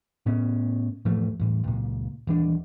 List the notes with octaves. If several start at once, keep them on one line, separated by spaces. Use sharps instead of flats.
A2 B3 C#4
E2 A2 F3 A3
E2 A2
C#2 A#2
D#1 E3 D4